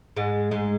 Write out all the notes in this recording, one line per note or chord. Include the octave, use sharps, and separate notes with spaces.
G#2 G#3
G#2 G#3